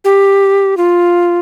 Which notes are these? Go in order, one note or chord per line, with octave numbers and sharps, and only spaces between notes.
G4
F4